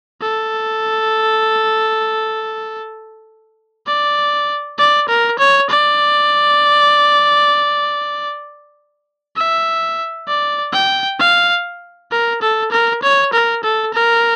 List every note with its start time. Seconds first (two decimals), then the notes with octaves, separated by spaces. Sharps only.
0.21 A4
3.87 D5
4.78 D5
5.08 A#4
5.39 C#5
5.70 D5
9.36 E5
10.28 D5
10.73 G5
11.19 F5
12.11 A#4
12.42 A4
12.71 A#4
13.02 C#5
13.33 A#4
13.63 A4
13.94 A#4